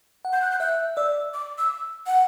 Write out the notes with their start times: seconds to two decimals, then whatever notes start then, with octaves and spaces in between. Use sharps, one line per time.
0.25 F#5
0.33 G6
0.42 F#6
0.51 G6
0.60 E5 F#6
0.97 D5 E6
1.34 D6
1.58 E6
2.07 F#5